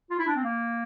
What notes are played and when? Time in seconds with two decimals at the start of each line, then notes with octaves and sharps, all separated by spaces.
0.10 F4
0.19 E4
0.27 D4
0.36 C4
0.43 A#3